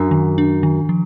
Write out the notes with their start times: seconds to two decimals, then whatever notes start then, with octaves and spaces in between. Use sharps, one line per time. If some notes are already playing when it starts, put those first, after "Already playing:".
Already playing: F#2 D4
0.11 D#3
0.38 D4
0.63 D#3
0.89 F3